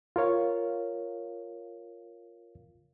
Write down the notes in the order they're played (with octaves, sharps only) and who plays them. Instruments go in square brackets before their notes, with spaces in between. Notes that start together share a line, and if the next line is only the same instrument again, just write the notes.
[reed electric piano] F4 A#4 C#5 F5